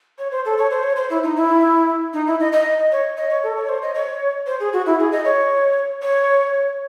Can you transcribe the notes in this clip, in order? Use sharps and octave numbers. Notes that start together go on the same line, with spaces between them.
C#5
C5
A4
C#5
C5
C#5
C5
E4
D#4
E4
D#4
E4
D#5
D#5
C#5
D#5
C#5
A4
C#5
C5
D#5
C#5
C5
G#4
F#4
E4
G#4
D#5
C#5
C#5